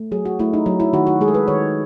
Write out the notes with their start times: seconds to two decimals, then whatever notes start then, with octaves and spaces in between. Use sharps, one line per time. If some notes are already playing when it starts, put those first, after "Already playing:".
Already playing: A3
0.12 F#3 G#4
0.25 F#4
0.39 A3 E4
0.54 D#4
0.66 F#3
0.80 E4
0.93 D#3 F#4
1.07 F#4
1.21 G#3 G#4
1.28 A4
1.34 B4
1.48 D#3 C#5